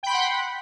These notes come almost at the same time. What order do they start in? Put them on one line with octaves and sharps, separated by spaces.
G5 B5 C6 F#5